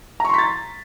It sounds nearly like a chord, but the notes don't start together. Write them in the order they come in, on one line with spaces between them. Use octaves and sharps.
A#5 C#6 C6 B6 A6